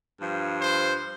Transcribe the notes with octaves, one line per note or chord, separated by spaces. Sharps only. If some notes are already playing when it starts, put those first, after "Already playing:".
G2 F3
C5